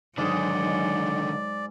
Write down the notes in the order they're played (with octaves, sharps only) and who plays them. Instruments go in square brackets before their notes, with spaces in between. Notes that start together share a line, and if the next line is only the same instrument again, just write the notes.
[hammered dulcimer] G#2 G#3 [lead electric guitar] D3 D#3 [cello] F#3 [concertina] D5